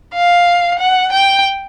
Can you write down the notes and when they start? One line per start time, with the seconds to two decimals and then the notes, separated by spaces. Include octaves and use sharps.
0.14 F5
0.79 F#5
1.12 G5